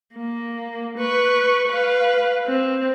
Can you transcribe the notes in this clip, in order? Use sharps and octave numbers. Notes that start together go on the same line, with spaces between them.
A#3
B4 C#6
B4 F5
C4